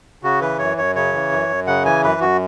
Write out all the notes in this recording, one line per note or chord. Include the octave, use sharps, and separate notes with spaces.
C#3 F#4
E3 B4
F#2 C#5
F#2 C#5
C#3 C#5
E3
F#2
F#2
C#3 F#5
E3 G#5
F#2 B4
F#2 F#4